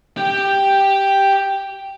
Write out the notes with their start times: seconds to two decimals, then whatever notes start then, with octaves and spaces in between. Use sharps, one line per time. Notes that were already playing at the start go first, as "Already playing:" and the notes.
0.17 G4 G5